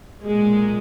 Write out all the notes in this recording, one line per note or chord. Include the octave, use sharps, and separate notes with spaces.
B1 A#2 G#3